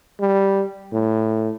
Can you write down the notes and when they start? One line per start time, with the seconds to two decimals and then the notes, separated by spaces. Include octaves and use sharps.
0.20 G3
0.92 A2